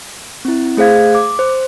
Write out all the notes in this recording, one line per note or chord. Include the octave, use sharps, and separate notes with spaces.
C4 E4
A3 G#4 C5 F5 G#6
D6
C5